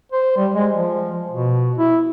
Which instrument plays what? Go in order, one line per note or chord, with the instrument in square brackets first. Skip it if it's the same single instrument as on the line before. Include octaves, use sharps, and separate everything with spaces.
[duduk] C5
G3
G#3
F3
B2
E4